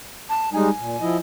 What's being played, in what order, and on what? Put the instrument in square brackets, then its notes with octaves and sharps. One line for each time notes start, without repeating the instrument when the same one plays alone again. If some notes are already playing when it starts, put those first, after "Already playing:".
[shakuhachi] A5
[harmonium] G3 G#3 D#4 [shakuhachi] G#5
[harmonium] A#2
F3 E4 D#5